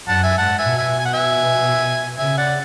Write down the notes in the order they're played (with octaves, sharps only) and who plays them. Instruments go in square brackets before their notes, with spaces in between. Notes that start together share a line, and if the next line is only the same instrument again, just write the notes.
[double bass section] F#2 [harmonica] F#5 A5
[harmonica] E5 G#5
[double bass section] G#2 [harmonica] F#5 A5
[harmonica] E5 G#5
[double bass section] B2
[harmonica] E5 G#5
G#5
F#5
E5 G#5
[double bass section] C#3 [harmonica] E5 G#5
[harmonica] D5 F#5